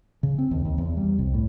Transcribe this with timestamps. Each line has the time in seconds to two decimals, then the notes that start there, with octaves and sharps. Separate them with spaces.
0.23 C#3
0.38 C4
0.51 D#2
0.65 D#2
0.78 E2
0.97 G3
1.19 C2
1.34 A2